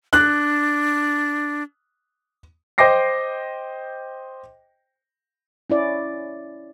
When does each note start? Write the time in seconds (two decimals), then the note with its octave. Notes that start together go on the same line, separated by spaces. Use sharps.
0.13 D4 F#6
2.78 C5 D#5 G5 D6 A#6 C7
5.70 C#4 E4 D5